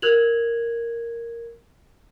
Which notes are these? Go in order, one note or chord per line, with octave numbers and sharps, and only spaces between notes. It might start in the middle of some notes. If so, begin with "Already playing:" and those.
A#4 F#6 G#6 F7 F#7